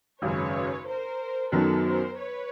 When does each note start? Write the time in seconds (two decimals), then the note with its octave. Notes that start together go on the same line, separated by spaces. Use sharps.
0.22 G#1 F#2 C#3 B4 C#5
0.87 A#4 C5
1.52 F#2 D#3 F#3 B3 A4 B4
1.85 A#4 C5
2.18 B4 C#5